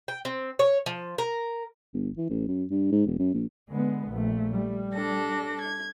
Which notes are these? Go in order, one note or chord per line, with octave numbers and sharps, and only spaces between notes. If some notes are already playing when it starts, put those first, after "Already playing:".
G5
C4
C#5
F3
A#4
G1
E3
A1
F#2
G2
G#2
E1
F#2
A#1
D3 G#3 B3
A#1 A3
G3
D4 A4 A#6
G#6